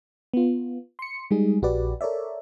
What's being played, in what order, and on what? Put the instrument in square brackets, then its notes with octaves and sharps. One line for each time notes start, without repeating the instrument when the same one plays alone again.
[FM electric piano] B3 F4
C6 C#7
G3 G#3 D#4 G#4
A#1 F#4 G4 B4 D5
A4 A#4 C#5 D5 E5